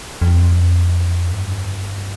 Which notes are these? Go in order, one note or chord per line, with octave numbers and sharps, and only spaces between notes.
F2
G2